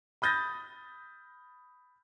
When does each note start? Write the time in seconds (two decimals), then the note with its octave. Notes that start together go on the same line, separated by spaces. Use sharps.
0.22 B5 D#6 G6 A6 A#6